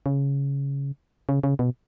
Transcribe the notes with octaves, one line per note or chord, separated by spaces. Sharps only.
C#3
C#3
C#3
B2